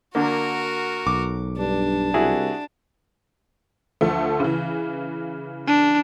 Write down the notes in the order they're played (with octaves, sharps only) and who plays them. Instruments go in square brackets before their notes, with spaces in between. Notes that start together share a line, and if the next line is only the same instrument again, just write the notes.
[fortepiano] D3 A#3 [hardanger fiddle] F#4 A#4
[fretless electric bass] B1 [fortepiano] D6
[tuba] G2 [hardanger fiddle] D4
[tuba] C2 [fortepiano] E4 F#4 G#4
[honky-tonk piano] D2 F3 A3
C#3 E3
[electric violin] D4